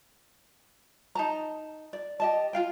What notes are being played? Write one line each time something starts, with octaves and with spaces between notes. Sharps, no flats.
D#4 A5 A#5
D5
G4 D#5 A5
F4 F5 G5